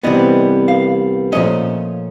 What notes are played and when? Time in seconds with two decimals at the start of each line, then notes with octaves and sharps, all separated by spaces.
0.04 C2 C3 E3 G3 B3 D#5
0.68 F5
1.32 A#2 F3 A3 C#4 D#5